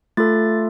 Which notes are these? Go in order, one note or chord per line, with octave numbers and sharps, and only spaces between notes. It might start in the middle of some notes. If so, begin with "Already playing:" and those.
A3 F4 A4 A6